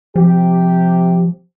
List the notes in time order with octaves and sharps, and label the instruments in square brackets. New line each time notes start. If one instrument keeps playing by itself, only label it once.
[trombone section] C3 G4 [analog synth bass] F3